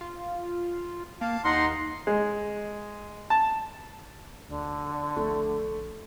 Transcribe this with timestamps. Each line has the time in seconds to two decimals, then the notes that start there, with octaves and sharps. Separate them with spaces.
0.01 F4
1.21 A#3 F5 A5
1.45 D#2 D#4 D#5 F#5 C6
2.07 G#3
3.30 A5
4.48 D2 D3
5.16 A#1 A3